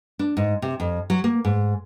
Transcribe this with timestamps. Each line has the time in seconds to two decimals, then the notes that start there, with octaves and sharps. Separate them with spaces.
0.19 D4
0.37 G#2
0.62 C3
0.80 F2
1.10 F#3
1.24 A#3
1.45 G#2